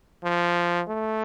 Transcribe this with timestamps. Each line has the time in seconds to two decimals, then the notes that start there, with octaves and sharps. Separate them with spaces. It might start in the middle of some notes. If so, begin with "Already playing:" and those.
0.24 F3
0.88 A3